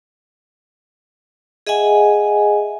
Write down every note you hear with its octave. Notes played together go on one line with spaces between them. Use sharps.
G#4 D#5 E5 F#5 G#5